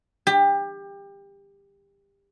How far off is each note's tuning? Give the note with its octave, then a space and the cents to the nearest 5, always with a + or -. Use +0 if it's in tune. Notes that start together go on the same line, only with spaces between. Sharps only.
G4 +25